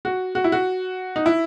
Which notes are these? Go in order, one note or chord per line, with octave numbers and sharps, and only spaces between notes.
F#4
F#4
E4
F#4
D#4
E4